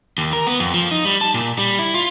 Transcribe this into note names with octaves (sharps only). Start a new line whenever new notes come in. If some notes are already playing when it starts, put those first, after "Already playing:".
D#2
A#4
B3
F2
F3
D#4
G3
A5
A#2
G3
E4
F4